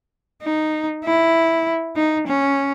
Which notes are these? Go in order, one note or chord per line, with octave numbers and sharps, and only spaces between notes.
D#4
E4
D#4
C#4